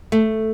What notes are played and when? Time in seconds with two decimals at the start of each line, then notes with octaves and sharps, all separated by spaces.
0.12 A3